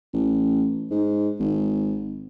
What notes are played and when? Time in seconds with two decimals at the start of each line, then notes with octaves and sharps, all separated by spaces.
0.13 A1
0.91 G#2
1.40 G#1